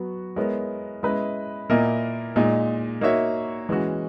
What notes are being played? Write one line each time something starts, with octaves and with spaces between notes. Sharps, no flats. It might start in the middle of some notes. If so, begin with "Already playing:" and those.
Already playing: F#3 B3 F#4
G#3 B3 E4 A#4 C#5
G#3 C#4 E4 B4 D#5
A#2 A#3 E4 A#4 D#5
A#2 G#3 D#4
A#3 D#4 F#4 C#5 E5
E3 G#3 C#4 F#4